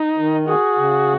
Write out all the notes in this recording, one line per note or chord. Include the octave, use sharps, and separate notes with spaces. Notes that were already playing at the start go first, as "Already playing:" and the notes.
Already playing: D#4
D#3
F#4 G#4
C#3